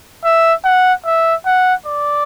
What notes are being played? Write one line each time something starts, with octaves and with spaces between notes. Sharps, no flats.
E5
F#5
E5
F#5
D5